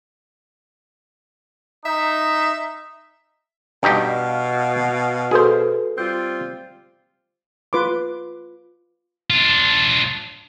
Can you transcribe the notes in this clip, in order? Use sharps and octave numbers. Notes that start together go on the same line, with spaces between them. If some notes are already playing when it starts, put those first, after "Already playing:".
D#4 E5
G2 B2 D#4 G4 F5
F#4 G#4 A4 B4 C5
G3 C4 F4 G6
F4 B4 C6 D6
D4 F4